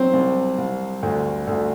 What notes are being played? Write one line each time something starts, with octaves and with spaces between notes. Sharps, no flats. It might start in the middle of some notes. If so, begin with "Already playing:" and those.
Already playing: F#3 C4
C2
C2
D2
D2